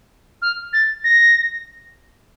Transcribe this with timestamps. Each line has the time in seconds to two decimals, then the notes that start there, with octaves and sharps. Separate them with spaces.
0.42 F6
0.73 A6
1.04 A#6